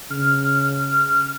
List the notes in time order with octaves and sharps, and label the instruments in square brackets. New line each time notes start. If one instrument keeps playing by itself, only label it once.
[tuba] C#3 [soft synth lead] F6